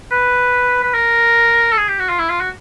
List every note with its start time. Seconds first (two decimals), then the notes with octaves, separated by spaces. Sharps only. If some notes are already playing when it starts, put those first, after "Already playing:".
0.11 B4
0.83 B4
0.94 A#4
1.72 A4
1.77 G#4
1.88 G4
1.99 F#4
2.09 F4
2.19 E4
2.29 F4
2.40 F#4